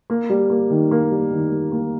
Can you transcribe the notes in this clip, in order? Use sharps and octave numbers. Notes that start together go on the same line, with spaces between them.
A#3
G3
A#3
D#3
A#3
G3
D#3
G3
A#3